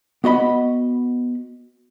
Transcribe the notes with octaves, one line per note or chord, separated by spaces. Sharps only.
B3 F#4 D#5 B5